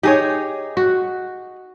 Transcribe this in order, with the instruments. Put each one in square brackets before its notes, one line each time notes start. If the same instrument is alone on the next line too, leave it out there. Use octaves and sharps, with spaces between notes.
[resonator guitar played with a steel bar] D#4 G#4 [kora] G4 C#5
[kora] F#4